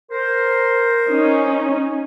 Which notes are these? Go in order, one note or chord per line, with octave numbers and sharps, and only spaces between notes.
A#4 C5
C#4 D#4